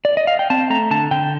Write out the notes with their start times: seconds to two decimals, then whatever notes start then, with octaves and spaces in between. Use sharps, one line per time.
0.05 D5
0.17 D#5
0.27 F5
0.39 G5
0.50 C4 A5
0.70 A3 A#5
0.91 D3 A5
1.11 D3 G5